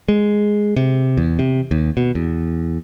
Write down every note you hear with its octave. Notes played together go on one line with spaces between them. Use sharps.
G#3
C3
E2
C3
D#2
B2
E2